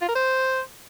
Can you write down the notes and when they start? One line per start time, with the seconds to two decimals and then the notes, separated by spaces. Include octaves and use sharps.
0.02 F4
0.08 A#4
0.15 C5